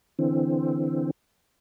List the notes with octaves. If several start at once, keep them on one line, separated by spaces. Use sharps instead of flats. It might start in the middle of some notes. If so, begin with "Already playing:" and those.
D3 E3 C4